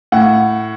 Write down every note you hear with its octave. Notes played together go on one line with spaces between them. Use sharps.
A2 F#5